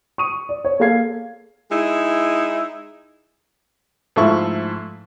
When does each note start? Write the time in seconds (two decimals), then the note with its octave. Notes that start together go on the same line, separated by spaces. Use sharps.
0.18 C#6 D#6 D#7
0.49 D5
0.65 C#5
0.79 A#3 G#4 A4 F5 G#6 C7
1.70 G#3 D#4 E4
4.16 G#2 F3 A3 E4 C#6